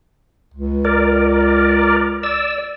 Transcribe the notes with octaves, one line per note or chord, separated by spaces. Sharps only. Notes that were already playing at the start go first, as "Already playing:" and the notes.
C#2
A#4 D5
D5 E6